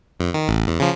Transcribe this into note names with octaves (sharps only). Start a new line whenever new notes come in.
F2
D#3
A1
E2
C#3 F3